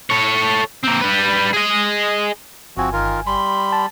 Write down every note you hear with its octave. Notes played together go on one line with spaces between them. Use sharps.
A4 C#5
A#3 C4
G3 B4
G#4 D#5
G1 F3 C4 F#4 G#5
D#3 F4 A#4
G3 B5 C6
A5